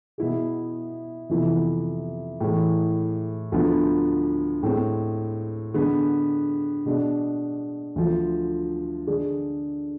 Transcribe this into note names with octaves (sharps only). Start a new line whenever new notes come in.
B2 B3 E4 G#4
F2 C3 E3 B3 E4
A2 E3 G#3
D2 D3 F3 B3
A2 G#3 C4
D3 G#3 B3
B2 G#3 D4
D2 D3 F3
D3 G#3 D4 G#4